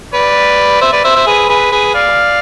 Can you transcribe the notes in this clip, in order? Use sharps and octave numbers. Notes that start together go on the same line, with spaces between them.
B4 D5
C5 E5
B4 D5
C5 E5
C5 E5
G#4 B4
G#4 B4
G#4 B4
D5 F5